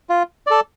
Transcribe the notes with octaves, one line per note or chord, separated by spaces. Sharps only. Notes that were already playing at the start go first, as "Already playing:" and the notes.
F4
A4 D5